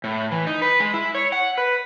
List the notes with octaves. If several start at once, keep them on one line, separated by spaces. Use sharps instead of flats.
A2
E3
D#4
B4
G#3
E4
C#5
F#5
B4